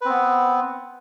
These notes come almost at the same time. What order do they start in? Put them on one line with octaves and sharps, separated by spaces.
B4 C4 B3